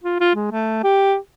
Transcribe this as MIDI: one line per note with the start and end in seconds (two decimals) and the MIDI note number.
0.04 0.16 65
0.20 0.32 65
0.35 0.48 56
0.51 0.83 57
0.84 1.16 67